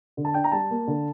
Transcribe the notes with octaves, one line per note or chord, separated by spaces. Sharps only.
D3
A5
D4 G5
A#5
G3 A5
A#3
D3